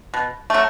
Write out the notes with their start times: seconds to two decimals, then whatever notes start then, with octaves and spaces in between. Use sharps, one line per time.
0.14 B2
0.50 F#3 A3